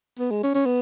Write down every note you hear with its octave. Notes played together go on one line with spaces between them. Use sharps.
B3
G#3
C#4
C#4
B3